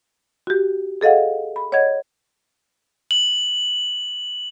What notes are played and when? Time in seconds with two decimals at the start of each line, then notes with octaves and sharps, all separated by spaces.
0.47 F#4 G4
1.01 G#4 A4 D#5 F5 F#5
1.56 B5
1.72 C#5 D#5 F#5 G#6
3.11 F#7